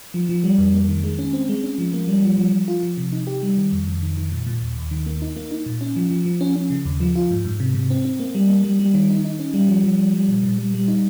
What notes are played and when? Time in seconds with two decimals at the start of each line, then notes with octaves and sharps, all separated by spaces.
0.14 F3
0.29 F3
0.44 G3
0.58 F2
0.74 A#3
0.88 D#3
1.03 G#3
1.19 C#4
1.33 C4
1.49 G#3
1.64 C#4
1.78 F3
1.93 A#3
2.08 G3
2.23 F3
2.38 F3
2.53 F3
2.68 F4
2.83 F3
2.97 C3
3.12 D#4
3.27 G4
3.42 G3
3.57 D#3
3.72 F2
3.87 F2
4.02 D#3
4.17 D#3
4.32 A#2
4.46 A#2
4.62 D#2
4.77 D#2
4.91 D#3
5.06 A#3
5.22 D#4
5.36 A#3
5.51 D#4
5.66 A#2
5.81 C#4
5.96 F3
6.11 F3
6.26 F3
6.41 C#4
6.56 C#4
6.70 C#3
6.85 D#2
7.00 F3
7.15 F4
7.30 G#2
7.45 G#2
7.60 C3
7.75 C3
7.90 C4
8.05 C4
8.19 A#3
8.35 G3
8.49 A#3
8.64 G3
8.79 G3
8.94 D#3
9.10 D#4
9.25 D#4
9.39 C#4
9.54 G3
9.69 F3
9.84 F3
9.99 G3
10.14 G3
10.28 A#2
10.43 A#2
10.58 G3
10.74 G3
10.88 D#4